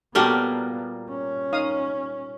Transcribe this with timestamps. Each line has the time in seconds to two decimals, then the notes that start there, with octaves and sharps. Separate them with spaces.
0.15 A#2 G3 A#3 B3 F#4 G4 A4
1.10 C#4
1.53 D#4 F5 D#6